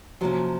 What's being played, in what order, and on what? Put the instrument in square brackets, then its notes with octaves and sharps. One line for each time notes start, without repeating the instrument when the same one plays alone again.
[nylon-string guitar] C3 F3 A#3 C#4 [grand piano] F#3